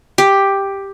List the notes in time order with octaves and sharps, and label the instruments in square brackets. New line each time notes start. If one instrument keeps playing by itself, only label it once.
[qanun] G4